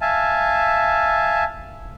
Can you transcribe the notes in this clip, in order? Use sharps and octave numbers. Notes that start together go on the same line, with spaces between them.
E5 F5 G#5 A5